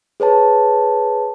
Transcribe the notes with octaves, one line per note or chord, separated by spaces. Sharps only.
G#4 B4 C#5 A5